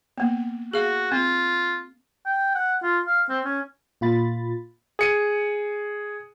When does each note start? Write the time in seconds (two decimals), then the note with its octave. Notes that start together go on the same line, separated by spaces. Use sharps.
0.18 A#3 B3
0.74 F#4 G#4 F5
1.12 C4 F4
2.26 G5
2.55 F#5
2.83 F4
3.06 F5
3.29 C4
3.45 C#4
4.01 A#2 F4 B5 A6
4.99 G#4 C#7 D#7